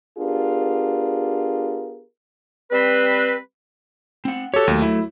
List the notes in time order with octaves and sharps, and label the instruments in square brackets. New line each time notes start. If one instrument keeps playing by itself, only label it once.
[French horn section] B3 D4 F4 G4 G#4 A#4
[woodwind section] G3 C4 B4
[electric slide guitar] C4 F#5
[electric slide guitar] F#4 G4 [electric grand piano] A4 C#5
[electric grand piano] D#2 [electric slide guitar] F#3 A3
[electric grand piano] E4